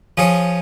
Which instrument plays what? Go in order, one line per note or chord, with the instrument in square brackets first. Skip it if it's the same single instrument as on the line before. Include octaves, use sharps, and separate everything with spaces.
[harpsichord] F3 C#4 G#4 C#5